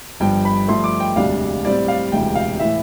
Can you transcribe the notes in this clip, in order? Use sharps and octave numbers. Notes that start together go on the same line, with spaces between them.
G1 G2 F3 G5
B5
G2 F3 A3 C6
D6
G5
E1 D2 C3 G3 D4 F5
A2 G3 C4 D5
F5
E1 D2 C3 E3 G5
F5
A2 E3 E5